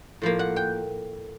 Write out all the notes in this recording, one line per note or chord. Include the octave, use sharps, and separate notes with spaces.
A2 F3 A#3
F#5
G5